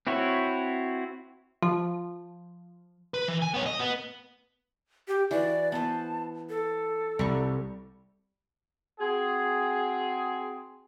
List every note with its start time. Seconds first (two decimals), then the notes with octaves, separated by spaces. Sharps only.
0.07 C4 E4 F#4 C#5
1.62 F3
3.14 B4
3.28 E3
3.42 G#5
3.54 B3 C#5
3.66 D#5
3.79 B3
5.08 G4
5.31 E3 F#4 D5
5.72 B3 C5 A5
6.50 A4
7.19 C2 G3 C#6
9.00 C4 F#4 G#4